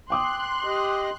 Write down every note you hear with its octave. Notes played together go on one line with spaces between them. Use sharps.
G5 C6 D6 D#6 F#6
G4 D#5